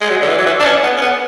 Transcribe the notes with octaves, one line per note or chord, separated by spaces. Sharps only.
G#3
F#3
D3
E3
F#3
E3
D4
C#4
B3
C#4
B3